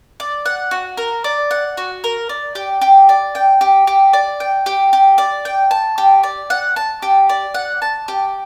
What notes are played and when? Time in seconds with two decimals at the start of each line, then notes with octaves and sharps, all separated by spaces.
0.20 D5
0.46 F#5
0.71 F#4
0.97 A#4
1.24 D5
1.51 F#5
1.78 F#4
2.04 A#4
2.29 D5
2.55 G4
2.81 G4
3.09 D5
3.35 G5
3.61 G4
3.87 G4
4.13 D5
4.40 G5
4.66 G4
4.93 G4
5.18 D5
5.45 G5
5.71 A5
5.98 G4
6.23 D5
6.50 F#5
6.76 A5
7.03 G4
7.29 D5
7.54 F#5
7.82 A5
8.08 G4